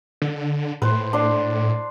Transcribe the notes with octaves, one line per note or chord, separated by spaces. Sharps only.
D3
A2 B4 C5
D4 C6